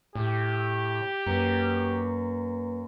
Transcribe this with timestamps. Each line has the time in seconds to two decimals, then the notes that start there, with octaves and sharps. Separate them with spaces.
0.15 A2 G4
1.27 F#2 A#3 B4